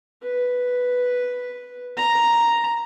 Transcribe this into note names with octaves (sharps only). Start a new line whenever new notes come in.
B4
A#5